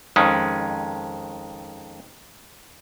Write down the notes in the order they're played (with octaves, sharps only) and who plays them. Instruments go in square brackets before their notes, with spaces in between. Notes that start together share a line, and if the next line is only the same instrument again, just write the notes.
[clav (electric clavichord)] F2 D#3 G#3 C#4